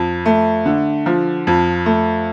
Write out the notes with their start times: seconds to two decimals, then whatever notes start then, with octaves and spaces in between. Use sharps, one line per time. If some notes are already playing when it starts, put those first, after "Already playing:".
Already playing: F2
0.26 A3
0.66 D3
1.06 F3
1.47 F2
1.86 A3